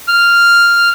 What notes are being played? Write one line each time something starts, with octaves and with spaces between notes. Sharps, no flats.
F6